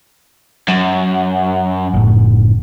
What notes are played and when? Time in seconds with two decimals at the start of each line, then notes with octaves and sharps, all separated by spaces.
0.69 F#2
1.94 F#1 A2